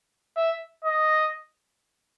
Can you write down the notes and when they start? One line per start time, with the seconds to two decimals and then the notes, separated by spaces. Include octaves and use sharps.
0.37 E5
0.85 D#5